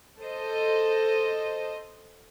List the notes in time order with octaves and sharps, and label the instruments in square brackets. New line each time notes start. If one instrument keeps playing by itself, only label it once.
[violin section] A4 C5 D#5